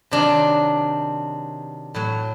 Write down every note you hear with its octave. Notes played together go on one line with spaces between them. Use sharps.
C3 D#3 F#3 D4
A2 F#3